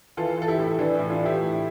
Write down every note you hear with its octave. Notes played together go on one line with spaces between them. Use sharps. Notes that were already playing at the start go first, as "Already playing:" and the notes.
E3 F4 A4
E3 A4
E4 G4
A2
E4
E3 D4
A2 E4
D4 F4
E3
E4 G4
A2